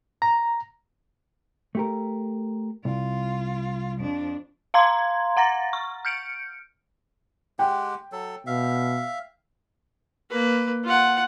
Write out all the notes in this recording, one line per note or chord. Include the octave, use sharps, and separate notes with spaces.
A#5
A3 G4 A#4
C2 F4
F2 D4
F5 A#5 C6 G#6
F#5 A#5 A6 A#6
C#6
F6 G6 C#7 D7
G#3 G4 F#5 G5
F#3 A4
B2 E5 F5
A#3 B4
F4 F#5